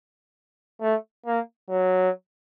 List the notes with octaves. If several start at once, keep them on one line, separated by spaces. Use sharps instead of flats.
A3
A#3
F#3